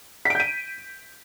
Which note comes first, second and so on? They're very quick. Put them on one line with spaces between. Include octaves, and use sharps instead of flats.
B6 D7 G6 D#7